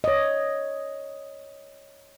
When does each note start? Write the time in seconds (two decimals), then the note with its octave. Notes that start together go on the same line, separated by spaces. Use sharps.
0.04 C#5 D#5